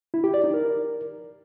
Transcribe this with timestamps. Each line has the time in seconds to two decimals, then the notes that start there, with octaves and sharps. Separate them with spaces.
0.14 E4
0.24 G4
0.34 D5
0.44 D#4
0.54 A#4